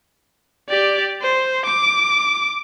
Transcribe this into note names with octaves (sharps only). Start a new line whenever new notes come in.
G4 D5
C5
D6